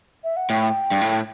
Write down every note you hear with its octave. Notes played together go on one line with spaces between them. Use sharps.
E5
F#5
A2 G5
G2
A2